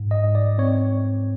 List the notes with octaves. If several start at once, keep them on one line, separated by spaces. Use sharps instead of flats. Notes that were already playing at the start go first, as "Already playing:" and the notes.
Already playing: G#2
D#5
G#2
D5
C4 C#5